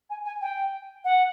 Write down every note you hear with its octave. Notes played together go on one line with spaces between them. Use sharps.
G#5
G#5
G5
F#5